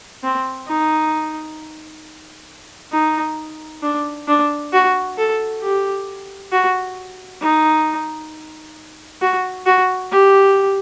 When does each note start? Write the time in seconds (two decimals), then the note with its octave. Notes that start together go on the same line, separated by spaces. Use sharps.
0.23 C4
0.68 D#4
2.92 D#4
3.83 D4
4.28 D4
4.73 F#4
5.18 A4
5.62 G4
6.52 F#4
7.41 D#4
9.22 F#4
9.66 F#4
10.12 G4